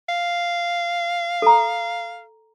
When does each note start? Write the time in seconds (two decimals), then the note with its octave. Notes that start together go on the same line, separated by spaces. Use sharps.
0.09 F5
1.42 A4 A#5